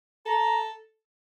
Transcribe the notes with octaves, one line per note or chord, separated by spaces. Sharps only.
A4 A#5